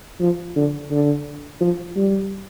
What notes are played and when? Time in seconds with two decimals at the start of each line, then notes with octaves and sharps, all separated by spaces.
0.20 F3
0.55 D3
0.90 D3
1.61 F3
1.96 G3